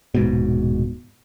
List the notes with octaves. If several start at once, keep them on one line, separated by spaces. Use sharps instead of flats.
D#1 G#2 B2